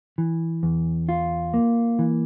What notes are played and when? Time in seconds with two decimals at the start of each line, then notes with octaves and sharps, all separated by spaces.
0.18 E3
0.63 E2
1.09 F4
1.54 A#3
1.99 E3